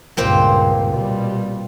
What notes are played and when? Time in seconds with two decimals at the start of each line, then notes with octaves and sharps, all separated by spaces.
0.17 C#2 G2 A#2 C4 C5
0.91 B2 G3